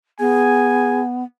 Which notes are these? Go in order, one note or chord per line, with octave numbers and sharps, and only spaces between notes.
B3 G#4 G#5